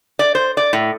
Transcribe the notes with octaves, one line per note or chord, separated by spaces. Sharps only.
D5
C5
D5
A2